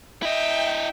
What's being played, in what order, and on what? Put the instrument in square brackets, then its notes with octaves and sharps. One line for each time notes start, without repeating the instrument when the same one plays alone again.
[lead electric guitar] E4 D#5 [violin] E5 G5